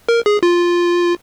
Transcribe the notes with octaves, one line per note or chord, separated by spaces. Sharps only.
A#4
G#4
F4